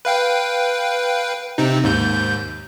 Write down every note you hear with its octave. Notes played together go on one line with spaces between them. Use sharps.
B4 F5 G5
C3 C4 D#4
D#2 G#2 G6